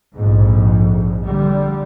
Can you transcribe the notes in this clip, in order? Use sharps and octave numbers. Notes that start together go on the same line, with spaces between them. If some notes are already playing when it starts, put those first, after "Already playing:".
A#1 F2 G#2
D3 G3